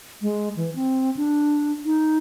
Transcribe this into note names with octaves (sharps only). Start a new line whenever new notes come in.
G#3
E3
C4
D4
D#4